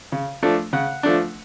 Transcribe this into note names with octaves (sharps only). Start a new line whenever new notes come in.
C#3
F3 A3 D4
C#3 F#5
F3 A3 D4